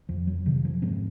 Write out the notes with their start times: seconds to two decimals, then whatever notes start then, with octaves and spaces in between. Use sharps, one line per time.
0.09 F2 F3
0.27 F#3
0.46 C3 D#3
0.65 F3
0.82 G#2 C4